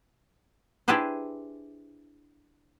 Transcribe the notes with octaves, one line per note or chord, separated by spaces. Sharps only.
D4 E4 G4 G#4 B4 C5